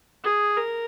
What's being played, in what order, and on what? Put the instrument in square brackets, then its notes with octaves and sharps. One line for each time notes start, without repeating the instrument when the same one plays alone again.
[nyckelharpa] G#4
A#4